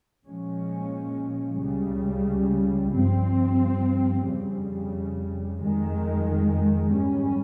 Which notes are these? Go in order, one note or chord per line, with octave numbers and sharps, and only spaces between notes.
A#2 F3 G#3 C#4
C#2 C#3 G3
G2 F3 C4
F2 C#3 G3
F2 D#3 G#3
G#2 G3 C#4